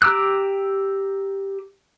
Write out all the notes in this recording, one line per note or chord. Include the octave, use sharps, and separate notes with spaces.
G4 A#5 D6 E6 F#6